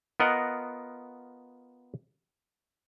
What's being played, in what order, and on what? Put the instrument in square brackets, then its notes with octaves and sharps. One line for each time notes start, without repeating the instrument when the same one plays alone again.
[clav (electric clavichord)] B3 F4 A#4 D#5 F#5